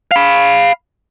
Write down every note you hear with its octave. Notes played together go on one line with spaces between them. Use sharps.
F5 B5